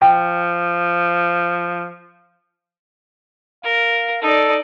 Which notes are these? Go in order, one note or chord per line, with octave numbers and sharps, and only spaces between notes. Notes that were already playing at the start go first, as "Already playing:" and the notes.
F3 G5
A#4 F5
D#4 A4 D5